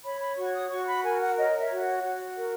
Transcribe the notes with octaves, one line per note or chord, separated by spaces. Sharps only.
C#5 B5
B5
F#4 C#6
D#6
F#4 C#6
B5
A#4 G#5
F#5
C#5 D#5
E5
F#4
F#5
F#4
A#4